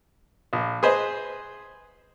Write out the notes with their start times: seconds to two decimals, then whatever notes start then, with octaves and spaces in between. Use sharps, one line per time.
0.53 A#1
0.83 G#4 B4 C5 D#5